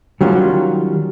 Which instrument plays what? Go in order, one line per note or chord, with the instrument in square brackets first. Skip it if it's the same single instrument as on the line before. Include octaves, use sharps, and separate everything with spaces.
[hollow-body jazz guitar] D#3 F#3 G3 C#4 F4